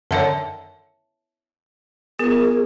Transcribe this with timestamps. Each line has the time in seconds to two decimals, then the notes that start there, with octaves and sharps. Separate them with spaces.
0.11 F#2 D3 D#3 C#5 E5 A5
2.19 B3 F4 G#4 A#4